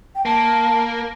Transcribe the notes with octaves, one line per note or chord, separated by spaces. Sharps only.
G5
A#3 A5